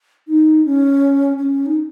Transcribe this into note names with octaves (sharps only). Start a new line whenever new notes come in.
D#4
C#4
C#4
D#4